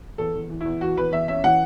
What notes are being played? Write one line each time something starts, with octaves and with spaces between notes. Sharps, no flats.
E2 A4
E2
E3
E2 E4
E3 F#4
E2 B4
E2 E5
C#4 E5
E3 F#5